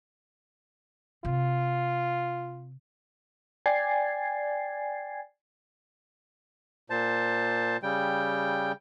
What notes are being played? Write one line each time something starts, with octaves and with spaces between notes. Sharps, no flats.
C3 F4
D5 G5 G#5 G#6 A6 C7
A#2 C5 A5
C#3 G3 G5